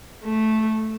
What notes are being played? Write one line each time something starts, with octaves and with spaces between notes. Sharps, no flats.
A3